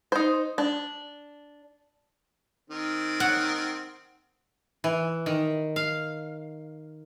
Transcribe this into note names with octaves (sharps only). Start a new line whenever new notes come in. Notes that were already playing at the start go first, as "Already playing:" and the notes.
D#4 C5
D4
D#3 C4
F#5
E3
D#3
F5